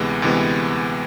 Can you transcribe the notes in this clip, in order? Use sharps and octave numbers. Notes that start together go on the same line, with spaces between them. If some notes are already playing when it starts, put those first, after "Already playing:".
Already playing: D2 C3 E3 G#3 B3
D2 C3 E3 G#3 B3